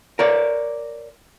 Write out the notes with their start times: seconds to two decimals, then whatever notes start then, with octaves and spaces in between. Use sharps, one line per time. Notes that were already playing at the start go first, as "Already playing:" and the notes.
0.19 A#4 C#5 D5